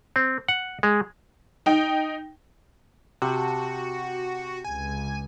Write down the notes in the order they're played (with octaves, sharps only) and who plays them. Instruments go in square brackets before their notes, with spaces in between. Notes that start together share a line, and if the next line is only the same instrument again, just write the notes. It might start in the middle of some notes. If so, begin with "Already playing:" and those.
[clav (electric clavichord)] C4
F#5
G#3
[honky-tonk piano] D#4 G5
[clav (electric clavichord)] C3 [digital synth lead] F#4 [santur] G4 G5 A5
[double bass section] C#2 [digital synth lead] G#5